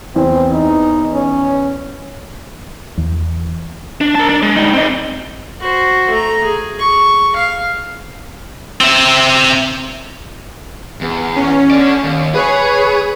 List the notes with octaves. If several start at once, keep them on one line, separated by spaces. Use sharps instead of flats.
E2 C4
D#4
C#4
E2
D4
A#4 A5
D4
G#3
G3 D#4
C4 D#4
F#4 C5
A3 A#5
G#4
C#6
F5
C4 E5
E2
C#4
A4 D5
D#2
G#4 B4 C#5